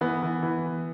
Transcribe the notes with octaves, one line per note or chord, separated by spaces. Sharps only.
E3 B3
E3
E3